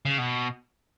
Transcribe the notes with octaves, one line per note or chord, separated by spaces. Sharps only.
C#3
B2